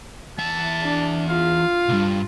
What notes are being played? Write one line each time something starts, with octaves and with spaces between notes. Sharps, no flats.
E2 E5 A5
D4
F4 F5
C2 G2